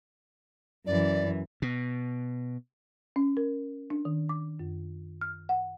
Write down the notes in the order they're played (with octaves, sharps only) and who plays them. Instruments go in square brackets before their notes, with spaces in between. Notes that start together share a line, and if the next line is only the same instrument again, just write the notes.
[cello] F#2 E3 [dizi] D5
[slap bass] B2
[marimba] C#4
A#4
D4
D#3
D6
F#2
F6
F#5